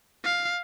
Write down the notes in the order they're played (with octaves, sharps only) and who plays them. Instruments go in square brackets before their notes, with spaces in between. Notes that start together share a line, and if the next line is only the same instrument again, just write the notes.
[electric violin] F5